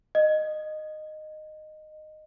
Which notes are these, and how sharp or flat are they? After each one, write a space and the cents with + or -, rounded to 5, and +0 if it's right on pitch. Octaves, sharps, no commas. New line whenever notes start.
D#5 -15